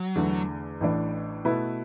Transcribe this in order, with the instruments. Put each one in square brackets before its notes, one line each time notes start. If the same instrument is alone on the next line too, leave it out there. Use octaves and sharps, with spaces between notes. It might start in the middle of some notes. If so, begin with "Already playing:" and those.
Already playing: [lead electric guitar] F#3
[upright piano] E2 D3 A3
A1 A2 E3 D4
B2 A3 E4 B4